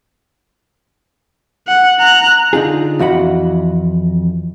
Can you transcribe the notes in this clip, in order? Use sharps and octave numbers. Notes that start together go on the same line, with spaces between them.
F#5
A#5 F#6
D3 D#4 F4 G#4
F2 E3 F#4 F#5 B5